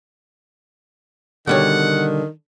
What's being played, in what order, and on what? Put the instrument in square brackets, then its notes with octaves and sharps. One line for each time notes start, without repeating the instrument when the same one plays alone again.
[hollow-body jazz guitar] B2 G3 C#5 [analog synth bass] D3 [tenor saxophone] D#3 [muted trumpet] F#5